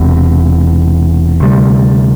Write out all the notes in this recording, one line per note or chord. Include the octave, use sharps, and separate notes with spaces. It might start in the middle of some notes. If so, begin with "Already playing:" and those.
Already playing: E1 E2 C3
D2 C3 G3